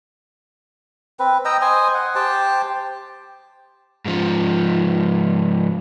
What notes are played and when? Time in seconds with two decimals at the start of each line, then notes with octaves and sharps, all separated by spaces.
1.19 C4 B4
1.45 D#5 G5 A#5 E6
1.61 C5 D#5 G#5
1.94 F#5
2.15 G4 C5 G5 A5
4.05 G#2 F3